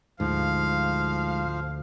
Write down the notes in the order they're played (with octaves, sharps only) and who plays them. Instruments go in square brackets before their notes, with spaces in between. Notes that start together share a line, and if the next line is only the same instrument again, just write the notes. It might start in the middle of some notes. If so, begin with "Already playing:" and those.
[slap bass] D2 [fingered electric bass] G#2 [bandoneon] F3 [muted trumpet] F5